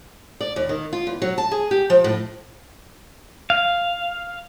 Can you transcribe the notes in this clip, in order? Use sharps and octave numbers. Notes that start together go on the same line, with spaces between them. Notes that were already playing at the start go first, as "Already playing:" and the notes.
D5
D#2
D#3
F4
E2
F#3
A5
G#4
G4
F3
A2
F5